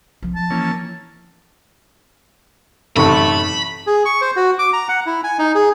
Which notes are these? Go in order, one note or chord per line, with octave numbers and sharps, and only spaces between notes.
F3 C4
A5
E3 A#3 C#4
A1 F#2 C3 A3 D#4 A4 B5 C#6
G#4
C#6
C5
F#4
D6
A#5
F#5
E4
G#5
D#4
G#4